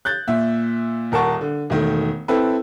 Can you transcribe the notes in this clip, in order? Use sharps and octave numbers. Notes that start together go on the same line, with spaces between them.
F#6 G6 A6
A#2 E5
D#1 A#4 F#5 A5 C#6
D3
E1 D#3 A3
C4 E4 A4 B4